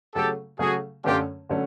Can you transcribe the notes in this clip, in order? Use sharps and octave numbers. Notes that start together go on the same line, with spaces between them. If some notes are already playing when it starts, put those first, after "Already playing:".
C#3 F#3 A3 G4 A4
C#3 F#3 A3 F#4 G#4
F#2 D3 F#3 A3 C#4 F4 G4
D3 F#3 A3 C#4